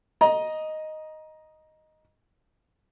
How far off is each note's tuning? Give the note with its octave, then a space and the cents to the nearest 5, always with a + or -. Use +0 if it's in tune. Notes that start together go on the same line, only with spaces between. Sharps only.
D#5 +0 A#5 +20